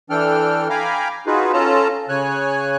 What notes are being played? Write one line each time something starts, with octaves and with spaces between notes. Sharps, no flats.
E3 D4 A4 G5 F6
F5 G5 G#5 A#5 B5 D6
D#4 F4 F#4 G#4 B4
C#4 F4 A4 A5 A#5
C#3 C#5 G#5 F#6